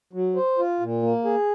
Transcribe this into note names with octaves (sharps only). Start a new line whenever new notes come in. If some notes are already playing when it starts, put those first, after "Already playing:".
F#3
C5
F4
A#2
A#3
G#4